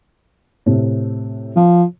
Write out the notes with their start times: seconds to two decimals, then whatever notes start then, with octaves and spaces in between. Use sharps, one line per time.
0.66 A2 C3
1.56 F3